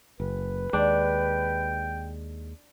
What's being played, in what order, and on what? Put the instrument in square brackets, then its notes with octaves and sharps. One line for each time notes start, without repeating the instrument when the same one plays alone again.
[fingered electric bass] F#1 [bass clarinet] B4
[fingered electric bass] D#2 G#3 [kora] D4 [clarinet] G5